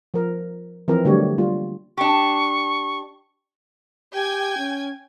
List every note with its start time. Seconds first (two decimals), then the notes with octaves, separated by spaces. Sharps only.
0.14 F3 A#4
0.88 E3 F3 C4 A#4
1.05 D3 F#3 G3 A3 G4 C#5
1.38 G3 A#3 F4
1.97 D4 G4 C#6
4.13 G4 G5 G#5 G#6
4.58 C#4